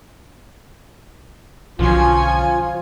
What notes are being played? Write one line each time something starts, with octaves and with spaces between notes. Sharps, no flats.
B1 B2 D3 F3 C#4 F4 G#5